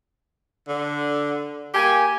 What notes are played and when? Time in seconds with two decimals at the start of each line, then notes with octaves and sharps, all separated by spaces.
0.68 D3
1.74 A#3 G4 G#5